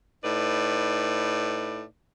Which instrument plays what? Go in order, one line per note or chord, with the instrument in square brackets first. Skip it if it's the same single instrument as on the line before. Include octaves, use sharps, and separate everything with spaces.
[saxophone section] A2 D#4 B4 D5